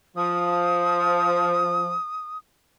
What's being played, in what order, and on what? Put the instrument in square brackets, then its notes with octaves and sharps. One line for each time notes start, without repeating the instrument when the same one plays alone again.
[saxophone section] F3 [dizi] D#6